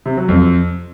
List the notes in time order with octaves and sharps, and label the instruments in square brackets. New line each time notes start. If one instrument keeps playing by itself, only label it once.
[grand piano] C3
F#3
F2